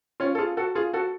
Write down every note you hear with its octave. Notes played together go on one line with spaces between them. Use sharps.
C#4 F4
A4
F4 G#4
F#4 A4
F4 G#4
F#4 A4